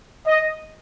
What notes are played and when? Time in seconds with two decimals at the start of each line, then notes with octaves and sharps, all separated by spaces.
0.26 D#5